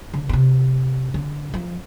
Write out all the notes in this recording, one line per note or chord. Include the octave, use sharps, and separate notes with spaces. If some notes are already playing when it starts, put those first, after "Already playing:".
D3
B2
C3
D3
F3